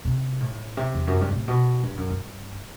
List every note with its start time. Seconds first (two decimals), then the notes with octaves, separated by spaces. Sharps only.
0.05 C3
0.40 A2
0.77 C3
0.95 E2
1.07 F#2
1.21 G2
1.34 A2
1.48 B2
1.83 G2
1.97 F#2
2.10 G2